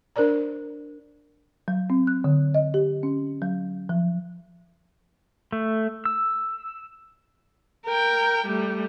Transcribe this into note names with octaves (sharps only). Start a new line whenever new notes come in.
D4 A#4 C5 D5 A#5
F#3
C4
F#6
D3
D#5
G4
C#4
F#3
F3
A3
E6
A#4 G5
G3 A3